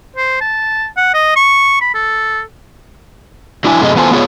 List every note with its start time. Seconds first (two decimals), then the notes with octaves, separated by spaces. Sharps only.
0.16 C5
0.41 A5
0.97 F#5
1.14 D#5
1.36 C#6
1.81 B5
1.94 A4
3.64 F#3 D4 E4 G#5
3.80 F#2 C3 A3 D4 G#4 D#5
3.96 E2 B3 F4 A4 C5 G#5
4.11 B3 F4 G#4 C#5